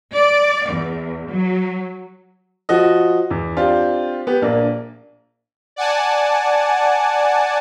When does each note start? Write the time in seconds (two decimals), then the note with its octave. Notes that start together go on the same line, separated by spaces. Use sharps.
0.15 D5
0.71 E2
1.29 F#3
2.69 F3 F#4 D#5
3.31 E2
3.56 C4 D4 F4 G4
4.27 B3 G4
4.42 A#1 A#3 D4
5.76 D5 F#5 G#5 A5